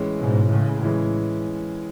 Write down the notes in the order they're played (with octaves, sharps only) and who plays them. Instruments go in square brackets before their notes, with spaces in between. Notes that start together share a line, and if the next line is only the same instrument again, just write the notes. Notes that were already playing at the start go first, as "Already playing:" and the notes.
Already playing: [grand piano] A2 E3 G#3 C#4
[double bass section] G#2 B2
A2 C#3
[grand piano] E3 G#3 C#4